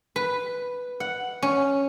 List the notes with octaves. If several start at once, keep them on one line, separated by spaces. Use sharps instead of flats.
B4
F#5
C#4